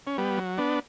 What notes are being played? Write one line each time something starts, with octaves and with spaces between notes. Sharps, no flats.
C#4
G3 B3
F#3
B3 D4